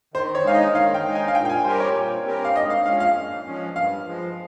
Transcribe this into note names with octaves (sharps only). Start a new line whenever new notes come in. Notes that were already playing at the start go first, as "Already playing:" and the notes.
D#3 C5
C#5
G#3 D#4 F5
D#5
D#3 F5
G5
G#3 D#4
G#5
F5
A#2 G5
G5
G#5
G3 C4 G4 A#4 C5
C#5
A#2
G3 C4 G4 A#4
F5
G#2 D#5
F5
F3 G#3 C#4 F5
F5
G#2
F3 G#3 C#4
G2 F5
F3 G#3